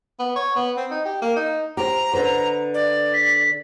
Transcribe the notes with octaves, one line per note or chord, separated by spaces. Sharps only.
B3
C#5
B3
C4
D#4
G4
A#3
D#4
G4 C5 A#5
D3 B4 C5
D5
B6